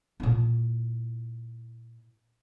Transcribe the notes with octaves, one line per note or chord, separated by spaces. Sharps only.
A#2 E4